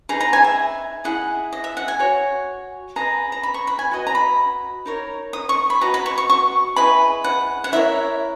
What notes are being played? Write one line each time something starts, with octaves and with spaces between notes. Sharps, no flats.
D#4 G#4 B4 A#5
A#5
G#5
E5
E4 G#4 D#5 F#5
D#5
E5
F#5
G#5
F#4 C#5
G#4 B4 D#5 A#5
A#5
B5
C#6
B5
G#5
F#4 B4 D#5
A#5
B5
D#4 A#4 C#5
D#6
C#6
B5
F#4 B4 D#5 A#5
B5
C#6
C#6
C#6
E4 G#4 B4 D#5 B5
F#5
F#5
E4 A#4 C#5 E5